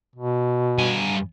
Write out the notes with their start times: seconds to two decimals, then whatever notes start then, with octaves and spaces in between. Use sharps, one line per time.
0.16 B2
0.78 G2 G#5